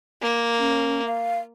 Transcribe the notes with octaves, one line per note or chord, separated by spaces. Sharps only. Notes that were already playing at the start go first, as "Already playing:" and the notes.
A#3
C#4
F5